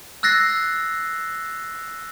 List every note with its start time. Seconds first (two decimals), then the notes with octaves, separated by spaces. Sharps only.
0.23 E6 F#6 A6 A#6 C7